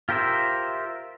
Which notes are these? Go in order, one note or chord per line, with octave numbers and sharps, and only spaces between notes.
F4 G4 A#4 C5 E5